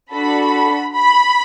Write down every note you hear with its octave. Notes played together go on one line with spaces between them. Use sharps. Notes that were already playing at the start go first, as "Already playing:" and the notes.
D4 F#4 A4 B5
B5